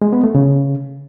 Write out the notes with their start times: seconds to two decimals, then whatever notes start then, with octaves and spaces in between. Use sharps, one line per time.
0.02 G#3
0.13 B3
0.24 A3
0.35 C#3